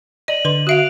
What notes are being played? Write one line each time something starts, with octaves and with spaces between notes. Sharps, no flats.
D5 D#5 D#7 F#7
D3 B4 C6
F#4 E5 F5 F#6 D7 F7